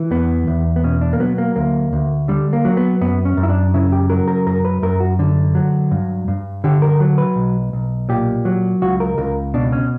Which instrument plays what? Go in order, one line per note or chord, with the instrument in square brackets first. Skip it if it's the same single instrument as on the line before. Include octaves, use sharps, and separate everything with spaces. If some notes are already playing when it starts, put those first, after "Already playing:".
Already playing: [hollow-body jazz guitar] E3
E2 B3
E2
B3
B2 C#4
D4
A#3
F#3 B3
A#3
D2 A#3
D2
D3 G3
A#3
F#3
B3
F#2 B3
C#4
F#2
E4
D4
C#3 E4
G4
F#3 A#4
A#4
F#2 A#4
B4
F#2 A#4
F#4
D3
F#3
G2
G2
D3 G4
A#4
F#3
B4
B1
B1
A#2 G4
F#3
C#2 F#4
A#4
C#2 A#4
B2 D4
C#4